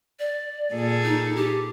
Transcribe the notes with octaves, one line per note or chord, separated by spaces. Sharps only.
D5
A#2 G#4 A4
D#4
G4